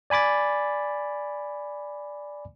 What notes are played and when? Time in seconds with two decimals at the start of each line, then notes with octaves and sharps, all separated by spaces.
0.10 D5 G#5 B5 D6 A6